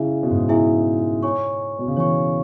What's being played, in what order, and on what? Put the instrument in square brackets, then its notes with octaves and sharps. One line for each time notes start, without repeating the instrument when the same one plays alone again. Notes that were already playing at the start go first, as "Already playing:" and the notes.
Already playing: [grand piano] C#3 [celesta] E4 G#4 E5 G#5
[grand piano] B2
G#2
[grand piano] B2 [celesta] E4 G#4 E5 G#5
[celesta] C#5 G#5 C#6
[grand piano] B2
C#3
[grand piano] E3 [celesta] C#5 G#5 C#6